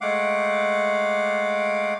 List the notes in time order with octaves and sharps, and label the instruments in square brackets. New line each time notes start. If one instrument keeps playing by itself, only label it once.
[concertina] G#3 A3 F5 F#5 D6